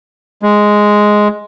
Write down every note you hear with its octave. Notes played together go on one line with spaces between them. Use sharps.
G#3